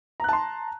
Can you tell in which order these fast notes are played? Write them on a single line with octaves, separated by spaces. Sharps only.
A#5 F#6 A5 C6